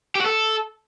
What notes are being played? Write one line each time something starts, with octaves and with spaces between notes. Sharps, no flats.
G4
F#4
A4